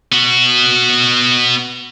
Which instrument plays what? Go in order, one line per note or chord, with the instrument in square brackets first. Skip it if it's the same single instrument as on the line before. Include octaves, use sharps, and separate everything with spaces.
[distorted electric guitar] B3 F#4